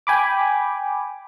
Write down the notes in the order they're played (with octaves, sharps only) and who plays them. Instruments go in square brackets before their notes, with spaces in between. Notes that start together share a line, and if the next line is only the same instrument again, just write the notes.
[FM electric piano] G5 G#5 B5 D6